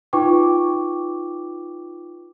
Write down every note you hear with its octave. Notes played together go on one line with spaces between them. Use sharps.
D#4 F4 B4 G5 C#6 D6